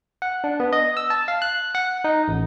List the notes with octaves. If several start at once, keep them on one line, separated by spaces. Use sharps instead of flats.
F#5
D4
B3
D#5
E6
A5
F5
F#6
F#5
D#4
A1